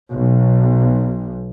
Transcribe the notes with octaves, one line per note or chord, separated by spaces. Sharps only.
B1